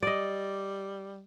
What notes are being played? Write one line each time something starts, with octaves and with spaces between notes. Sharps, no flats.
G3 D5 D#5